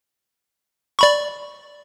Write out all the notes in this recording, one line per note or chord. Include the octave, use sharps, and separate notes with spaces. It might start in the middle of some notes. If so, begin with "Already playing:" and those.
D5 B5 C#6